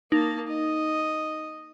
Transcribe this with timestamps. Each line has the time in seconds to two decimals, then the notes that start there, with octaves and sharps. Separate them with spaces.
0.12 A#3 D#4 A5
0.48 D#5